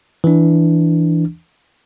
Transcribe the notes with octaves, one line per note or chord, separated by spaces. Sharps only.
E3 D4